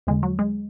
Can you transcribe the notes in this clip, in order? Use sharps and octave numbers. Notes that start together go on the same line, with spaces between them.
E2 D3 G#3
F#3
G#3